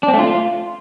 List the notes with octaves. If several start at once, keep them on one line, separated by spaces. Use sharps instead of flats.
D4
C4
A3
F4